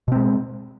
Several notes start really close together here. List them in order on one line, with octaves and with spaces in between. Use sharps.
B2 C4 G#3